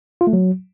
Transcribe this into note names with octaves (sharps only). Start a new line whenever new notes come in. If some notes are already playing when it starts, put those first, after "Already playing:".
F4
A3
F#3